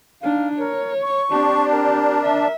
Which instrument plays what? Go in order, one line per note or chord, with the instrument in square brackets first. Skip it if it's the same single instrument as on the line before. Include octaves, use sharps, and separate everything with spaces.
[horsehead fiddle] D4 D#4 [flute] F5
[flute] A#4 [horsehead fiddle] C#5
[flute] C#6
[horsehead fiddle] C4 G4 [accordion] D4
[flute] A#4
[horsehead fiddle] E5